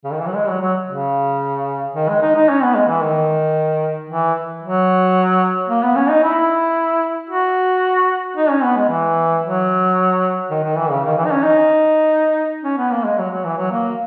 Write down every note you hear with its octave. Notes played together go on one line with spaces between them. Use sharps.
C#3
D#3
E3
F#3
G#3
F#3
F#3
C#3
D#3
G#3
D#4
D#4
C#4
B3
G#3
E3
D#3
E3
F#3
A#3
B3
C#4
D#4
E4
F#4
D#4
C#4
B3
G#3
E3
F#3
D#3
D#3
E3
C#3
D#3
E3
D#4
C#4
D#4
C#4
B3
A#3
G#3
F#3
F#3
E3
F#3
A#3